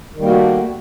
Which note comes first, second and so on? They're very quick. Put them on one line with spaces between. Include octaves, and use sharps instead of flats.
D#3 G3 A#3 F#4 A3